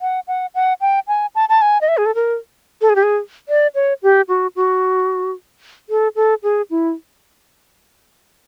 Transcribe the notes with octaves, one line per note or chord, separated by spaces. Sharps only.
F#5
F#5
F#5
G5
G#5
A5
A5
G#5
D#5
E5
G#4
A4
A#4
A4
G#4
G4
G#4
D5
C#5
G4
F#4
F#4
A4
A4
G#4
E4